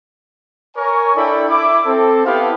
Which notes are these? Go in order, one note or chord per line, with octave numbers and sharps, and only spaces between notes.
A#4 C#5 G#5 C#6
D4 E4 A4 D5 G5 B5
E4 D6
C4 A4
B3 E4 G4 F5 B5